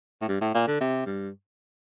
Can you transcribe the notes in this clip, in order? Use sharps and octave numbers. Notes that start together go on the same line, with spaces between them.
A2
G2
A2
A#2
D3
C3
G2